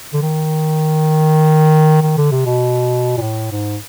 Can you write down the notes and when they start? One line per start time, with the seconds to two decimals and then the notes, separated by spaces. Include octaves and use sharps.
0.13 D3
0.22 D#3
2.02 D#3
2.17 D3
2.32 C3
2.46 B2
3.18 A#2
3.21 A2
3.52 G#2